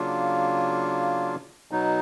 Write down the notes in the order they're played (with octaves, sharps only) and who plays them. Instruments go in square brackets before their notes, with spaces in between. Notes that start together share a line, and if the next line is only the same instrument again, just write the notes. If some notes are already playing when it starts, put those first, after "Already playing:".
Already playing: [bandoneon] C#3 F#3 A#3 D4 F4
B2 F#3 B3 D#4